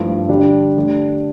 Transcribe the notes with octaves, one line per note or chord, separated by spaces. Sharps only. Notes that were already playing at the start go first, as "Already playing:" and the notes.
Already playing: G2 F3 A3 E4
D3 G3 D4 G4
D3 A3 D4 G4